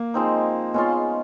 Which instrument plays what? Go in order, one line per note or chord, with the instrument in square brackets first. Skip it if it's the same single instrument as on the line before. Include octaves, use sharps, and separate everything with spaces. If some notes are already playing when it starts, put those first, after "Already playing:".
Already playing: [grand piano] A#3
[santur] F3 G#3 C4 D#4
[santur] G#3 C#4 F4 [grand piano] B3